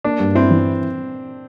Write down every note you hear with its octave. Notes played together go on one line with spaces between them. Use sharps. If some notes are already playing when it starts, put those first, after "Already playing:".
A#3 D4
G2
C4 E4
E3